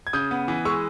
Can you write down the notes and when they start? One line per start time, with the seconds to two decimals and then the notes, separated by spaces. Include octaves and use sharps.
0.07 G#6
0.13 C#3 D#6 G6
0.31 B3
0.48 E3
0.65 G#3 C#6 E6